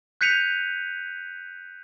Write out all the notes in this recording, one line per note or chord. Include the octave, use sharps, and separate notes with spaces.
F#6 G6 B6 C#7 D#7 F7